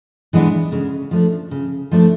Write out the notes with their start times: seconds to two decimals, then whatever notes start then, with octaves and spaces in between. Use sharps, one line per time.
0.33 E3 G#3 B3 D4
0.72 C#3
1.11 F3 A3 D4
1.51 C#3
1.91 F3 A3 D4